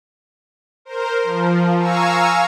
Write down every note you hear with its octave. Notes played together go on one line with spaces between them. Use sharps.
A#4 C5
F3
F5 G#5 A#5 C#6 E6